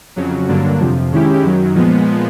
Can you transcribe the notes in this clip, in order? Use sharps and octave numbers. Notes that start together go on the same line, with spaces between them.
F2 C#3 F#3
G2 D3 F#3 A#3 D4
F2 C3 F3
D#3 G#3 C#4 E4 G4
F#2 D#3 F#3
A#2 F3 G#3 B3